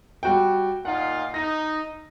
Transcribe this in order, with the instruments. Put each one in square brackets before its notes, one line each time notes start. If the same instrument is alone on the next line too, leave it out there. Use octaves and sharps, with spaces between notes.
[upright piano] G3 F#4 G5
[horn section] A#2 D#4 F4 [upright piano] F#5
[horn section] D#4 [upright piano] A#6